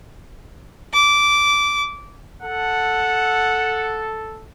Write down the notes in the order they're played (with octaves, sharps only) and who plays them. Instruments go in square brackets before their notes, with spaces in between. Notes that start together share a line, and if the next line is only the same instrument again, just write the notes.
[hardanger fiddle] D6
[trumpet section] A4 [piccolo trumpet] F#5